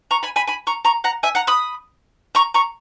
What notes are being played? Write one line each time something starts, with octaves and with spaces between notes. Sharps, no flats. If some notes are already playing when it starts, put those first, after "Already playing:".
A#5 C#6
G#5 B5
G#5 B5
G#5 B5
A#5 C#6
A#5 C#6
F#5 A#5
E5 G#5
F#5 A#5
B5 D#6
A#5 C#6
A#5 C#6